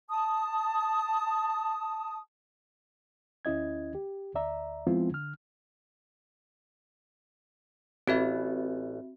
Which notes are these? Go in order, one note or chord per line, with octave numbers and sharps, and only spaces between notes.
A5 D#6
D2 C#4 E4 D#5 G#6
G4
D2 D5 E5 A#5
F3 G#3 B3 C4 E4 F4
D3 F6
A1 C4 F#4 E5